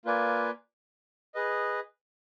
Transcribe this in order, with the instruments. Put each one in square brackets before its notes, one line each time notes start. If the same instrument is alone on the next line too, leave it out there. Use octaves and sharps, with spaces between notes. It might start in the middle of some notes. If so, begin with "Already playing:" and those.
[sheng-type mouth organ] A#3 F4 B4 D5 G#5
G#4 B4 D#5